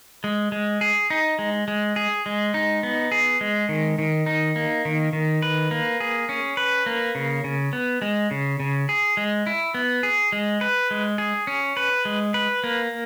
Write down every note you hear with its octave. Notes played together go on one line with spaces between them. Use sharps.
G#3
G#3
G#4
D#4
G#3
G#3
G#4
G#3
D#4
B3
G#4
G#3
D#3
D#3
D#4
A#3
D#3
D#3
B4
A#3
G#4
C#4
B4
A#3
C#3
C#3
B3
G#3
C#3
C#3
G#4
G#3
E4
B3
G#4
G#3
B4
G#3
G#4
C#4
B4
G#3
B4
A#3